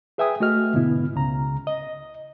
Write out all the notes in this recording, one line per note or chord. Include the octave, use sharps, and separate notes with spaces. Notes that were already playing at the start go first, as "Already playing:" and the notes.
G#4 B4 E5 G5 G#5 D#6
A3 F#4 D#5 F6
G#2 B2 D3 B3 E4
C#2 C#3 A#5
D#5